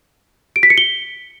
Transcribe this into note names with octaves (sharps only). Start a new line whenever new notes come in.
D7
B6
C#7
G7